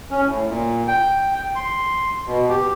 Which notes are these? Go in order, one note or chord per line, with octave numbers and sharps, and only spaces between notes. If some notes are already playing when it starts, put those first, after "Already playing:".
C#4
A2
A#2
G5
C6
B2
G4